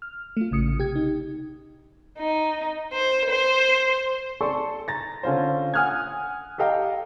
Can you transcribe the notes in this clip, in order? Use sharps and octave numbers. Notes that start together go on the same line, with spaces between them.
F6
A3 F4
A1 C#3 D#6 C#7
C3 G4 G#6
D#4
D#4
C5
C5
G#4 A4 D5 A5 C6 C#6
A#5 A6 A#6
D3 C#4 F4 C5
F#5 G#5 D#6 F6 F#6 G#6
G4 A4 D#5 F5 G5 A#5